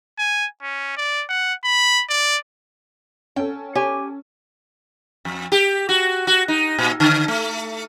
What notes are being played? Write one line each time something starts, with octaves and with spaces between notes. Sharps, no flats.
G#5
C#4
D5
F#5
B5
D5
C#4 A4 G5
G4 C#5 G#5
F2
G4
F#4
F#4
D#4
A#2
D3
A3